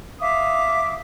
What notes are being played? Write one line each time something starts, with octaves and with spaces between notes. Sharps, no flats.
E5 F5 D6 D#6